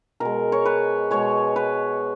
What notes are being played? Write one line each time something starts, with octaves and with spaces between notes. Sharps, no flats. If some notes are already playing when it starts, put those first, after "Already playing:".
B2 G#3 A#4
C#5
B4
B2 G#3 C#5
B4